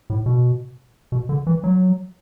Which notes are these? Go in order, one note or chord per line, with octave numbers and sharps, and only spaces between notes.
A2
B2
B2
D3
E3
F#3